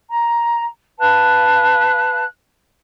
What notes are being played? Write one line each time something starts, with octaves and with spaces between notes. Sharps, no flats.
A#5
B4 F5 A5 F#6